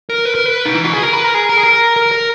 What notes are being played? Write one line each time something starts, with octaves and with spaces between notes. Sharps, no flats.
A#4
B4
A#4
B4
D#4
E4
F#4
G#4
A#4
B4
A#4
G#4
A#4
G#4
A#4
A#4
A#4